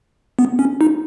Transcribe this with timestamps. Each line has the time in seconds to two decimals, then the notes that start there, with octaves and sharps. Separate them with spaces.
0.39 B3
0.59 C#4
0.81 D#4